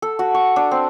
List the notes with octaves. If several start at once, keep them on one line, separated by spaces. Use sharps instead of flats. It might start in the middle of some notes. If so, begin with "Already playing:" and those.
A4
F#4
C#6
D4
C4